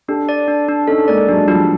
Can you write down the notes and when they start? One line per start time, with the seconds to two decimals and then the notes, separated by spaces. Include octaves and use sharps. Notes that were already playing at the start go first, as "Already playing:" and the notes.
0.08 D4 G4 A4
0.29 D5
0.48 D4
0.68 D4
0.87 C#4 D#4 A4
1.07 G#3 A#3 D5
1.28 F#3 G#3 D4
1.48 F3 G3 D4